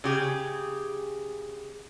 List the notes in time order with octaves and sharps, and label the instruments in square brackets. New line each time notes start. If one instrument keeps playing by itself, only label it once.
[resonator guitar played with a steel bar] C#3 G4 G#4